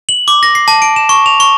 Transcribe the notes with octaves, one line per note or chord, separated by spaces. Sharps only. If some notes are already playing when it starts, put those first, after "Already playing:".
F#7
D6
A#6
C7
A5
D7
E7
C#6
F7
C#6